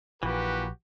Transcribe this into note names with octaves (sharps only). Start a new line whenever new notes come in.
A#1 A#2 E3 F#4 G4 B4